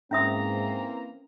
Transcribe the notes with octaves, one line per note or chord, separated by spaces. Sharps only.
G#2 E3 A#3 C4 C#4 E5 A#5 D#6